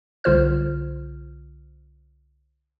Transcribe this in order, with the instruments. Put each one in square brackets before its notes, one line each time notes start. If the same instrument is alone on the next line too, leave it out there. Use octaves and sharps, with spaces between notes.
[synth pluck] C2 D3 F4 C5 F6